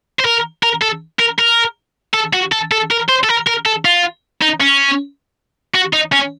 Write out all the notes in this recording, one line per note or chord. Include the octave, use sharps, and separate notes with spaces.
C5
A#4
A#4
A4
A#4
A#4
A4
F#4
A4
A4
A#4
C5
A4
A#4
A#4
A4
F4
D#4
C#4
F#4
D#4
C#4